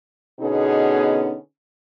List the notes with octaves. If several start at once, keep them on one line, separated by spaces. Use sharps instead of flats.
B2 D3 B3 C#4 D#4 G#4